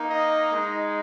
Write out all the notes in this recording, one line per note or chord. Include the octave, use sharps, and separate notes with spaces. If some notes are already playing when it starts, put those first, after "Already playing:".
Already playing: A#3 D#4
D#5
G#3 D#4